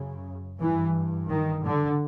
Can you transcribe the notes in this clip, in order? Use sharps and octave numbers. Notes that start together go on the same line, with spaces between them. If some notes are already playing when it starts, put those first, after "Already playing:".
Already playing: F#2 C#3
G2 E3
D#3
D3